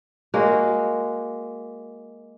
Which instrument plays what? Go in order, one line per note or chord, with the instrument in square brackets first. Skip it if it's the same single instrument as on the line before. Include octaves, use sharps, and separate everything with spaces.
[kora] G#3 A#3 F#4